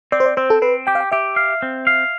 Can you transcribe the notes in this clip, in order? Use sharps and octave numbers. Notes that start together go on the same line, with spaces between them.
C4 D5
C5
D5
C4 C5
A4
C4 B4
G4 G5
F5
G5
G4 E5
F5
C4
F5